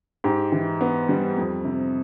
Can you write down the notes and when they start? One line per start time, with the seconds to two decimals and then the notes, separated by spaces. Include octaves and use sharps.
0.24 G#2 G4
0.52 E3
0.81 B3
1.09 G3
1.37 F2
1.65 C3